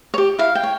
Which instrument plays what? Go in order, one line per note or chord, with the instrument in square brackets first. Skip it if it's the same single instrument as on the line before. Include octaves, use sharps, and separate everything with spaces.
[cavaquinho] C#5
G4
E4 F5
G5
C#5